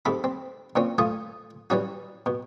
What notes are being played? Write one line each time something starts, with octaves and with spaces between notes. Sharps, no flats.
G#2 C3 A4 B5
C4
A#2 C4 C#4
A3 F4 G#5 D#6
E3 G3 C#4 F#4
B2